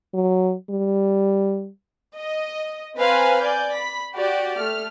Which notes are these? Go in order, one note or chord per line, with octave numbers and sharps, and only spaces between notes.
F#3
G3
D#5
C4 B4 C5 F5 G#5 A#5
D5 G#5 G6
B5 B6
F#4 G4 D5
A3 F6